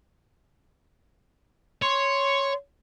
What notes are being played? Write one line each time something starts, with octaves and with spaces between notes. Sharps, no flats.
C#5 C6